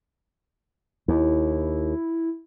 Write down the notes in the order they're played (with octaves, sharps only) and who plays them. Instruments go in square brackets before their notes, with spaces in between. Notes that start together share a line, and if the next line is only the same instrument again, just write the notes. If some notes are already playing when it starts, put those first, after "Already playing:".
[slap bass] D#2 [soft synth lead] E4